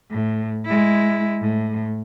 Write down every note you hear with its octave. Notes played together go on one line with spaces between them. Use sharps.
A2
G#3 E4
A2